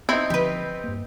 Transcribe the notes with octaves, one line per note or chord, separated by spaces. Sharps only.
C4 D#4 E4
D3 F3 G4 B4
G2 A#3